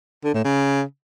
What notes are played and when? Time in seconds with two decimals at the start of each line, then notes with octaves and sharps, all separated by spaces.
0.24 D3
0.34 A2
0.44 C#3